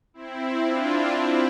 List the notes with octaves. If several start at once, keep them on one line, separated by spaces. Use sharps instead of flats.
C4 E4
D4 F4
C4 E4